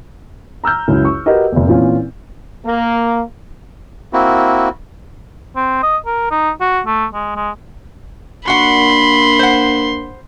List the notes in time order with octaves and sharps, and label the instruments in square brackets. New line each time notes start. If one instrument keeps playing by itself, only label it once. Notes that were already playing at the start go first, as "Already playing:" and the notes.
[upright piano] A#5 E6 F6 G6
C#2 F#2 E4
C#6
F#4 G4 A#4 B4 D#5
F1 E2
A#2 E3 C4 C#4 F4
[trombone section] A#3
[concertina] A#3 C4 E4 F#4
[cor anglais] C4
D#5
A#4
D#4
F#4
A3
G#3
G#3
[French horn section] A#3 D4 [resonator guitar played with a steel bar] F#4 F#5 [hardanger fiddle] B5 [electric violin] C6
[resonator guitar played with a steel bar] C5 F#5